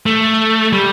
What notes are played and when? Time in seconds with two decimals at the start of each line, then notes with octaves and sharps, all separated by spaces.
0.06 A3
0.73 G3